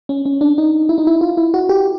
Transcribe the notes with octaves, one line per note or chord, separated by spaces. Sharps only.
C#4
C#4
D4
D#4
E4
D#4
E4
F4
E4
F#4
G4